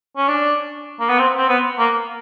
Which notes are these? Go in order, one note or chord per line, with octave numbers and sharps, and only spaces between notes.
C#4
D4
A#3
B3
C4
C4
B3
A#3